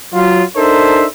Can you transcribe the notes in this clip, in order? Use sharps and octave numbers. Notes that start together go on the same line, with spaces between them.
F#3 F4
D4 D#4 A4 A#4 C5 E5